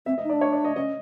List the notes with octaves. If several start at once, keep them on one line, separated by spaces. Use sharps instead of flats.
C4 E5
D#5
D#4
D5
D4
C#5
D5
D#5
C#4 D#5